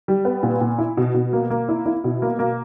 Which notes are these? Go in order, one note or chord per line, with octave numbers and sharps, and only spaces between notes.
G3
B3
A#2
A#2
E4
B2
B2
A#3
A#3
E4
E4
B2
A#3
A#3